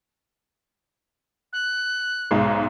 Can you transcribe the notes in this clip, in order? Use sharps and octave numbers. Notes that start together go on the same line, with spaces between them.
F#6
B1 G#2 G#3